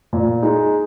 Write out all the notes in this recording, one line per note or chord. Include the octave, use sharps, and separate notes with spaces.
A#2
G#3 D#4